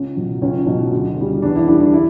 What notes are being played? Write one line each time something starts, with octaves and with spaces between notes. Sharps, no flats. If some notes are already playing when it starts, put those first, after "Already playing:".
Already playing: C#2 C#4
B2 F#3
C#2 C#4
B2 F#3
D2
C#3 G3
E2 D4
E4
D3 G3 D4
D4
E4